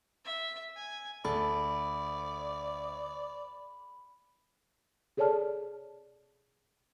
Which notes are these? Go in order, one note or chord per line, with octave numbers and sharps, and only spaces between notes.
E5
G#5
D2 A4 D5 B5
G#4 A4 C#5 D5 A5 F6